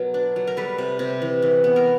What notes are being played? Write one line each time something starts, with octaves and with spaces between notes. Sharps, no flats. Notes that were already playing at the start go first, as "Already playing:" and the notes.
Already playing: B2 F#3 A#4
D4
F#3
A#4
G3 A4 B4
C3
C3
E3
E3
B3
A#4